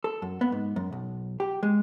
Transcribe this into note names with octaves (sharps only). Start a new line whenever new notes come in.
A4
F#2
B3
G#2
F#2
B1
G4
G#3